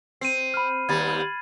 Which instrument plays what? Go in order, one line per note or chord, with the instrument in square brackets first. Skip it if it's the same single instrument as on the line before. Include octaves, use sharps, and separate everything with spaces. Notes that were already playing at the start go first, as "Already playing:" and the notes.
[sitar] C4 [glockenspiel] C7 D#7
[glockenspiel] B5 F6
[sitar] D#2 G3 [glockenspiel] G#6 A6